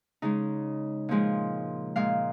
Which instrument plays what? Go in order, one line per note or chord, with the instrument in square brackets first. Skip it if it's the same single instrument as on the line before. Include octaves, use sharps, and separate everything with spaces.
[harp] C#3 G#3 D#4
A#2 F3 G#3
A#2 G#3 F5